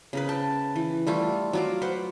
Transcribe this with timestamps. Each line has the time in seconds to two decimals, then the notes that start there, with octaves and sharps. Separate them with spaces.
0.13 C#3 A#4 B4
0.29 G5 A5
0.76 E3
1.07 G3 A3 F4
1.53 F#3 F4 D6
1.82 B4 C5 F#5